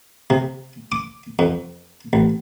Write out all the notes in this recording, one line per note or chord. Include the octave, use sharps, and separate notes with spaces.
C3
D6
F2
A1